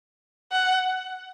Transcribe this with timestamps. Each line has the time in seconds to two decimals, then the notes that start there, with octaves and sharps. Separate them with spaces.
0.52 F#5